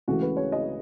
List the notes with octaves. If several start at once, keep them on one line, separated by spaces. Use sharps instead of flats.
C#2 C#3 E3 A3 F#4
B4
C#5
D#5